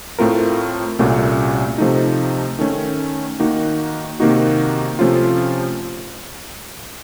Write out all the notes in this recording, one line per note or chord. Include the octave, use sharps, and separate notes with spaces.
A2 A3 C4 F4 A#4
C2 A#2 A3 C#4 F#4
C3 F3 A3 D#4
D#3 A3 C#4
D#3 A#3 D#4 F#4
C3 D#3 A#3 D#4 F#4
C3 F3 A3 C#4 F4